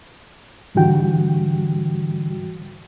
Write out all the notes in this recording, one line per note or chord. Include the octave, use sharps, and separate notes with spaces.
G#2 D3 E3 G3 F#4 G5